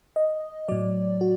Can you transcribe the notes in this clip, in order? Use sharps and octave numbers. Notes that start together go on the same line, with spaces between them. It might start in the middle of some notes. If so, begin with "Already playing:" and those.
D#5
A2 F#3 D5
F#4